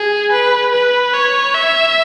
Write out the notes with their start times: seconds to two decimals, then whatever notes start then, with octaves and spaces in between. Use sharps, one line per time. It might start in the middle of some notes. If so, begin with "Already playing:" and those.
Already playing: G#4
0.32 B4
0.72 B4
1.14 C#5
1.55 E5